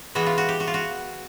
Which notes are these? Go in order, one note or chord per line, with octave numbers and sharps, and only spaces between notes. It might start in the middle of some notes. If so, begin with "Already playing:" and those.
E3 G#3 B3 F#4
F4
F#4
G4
F#4
F4
F#4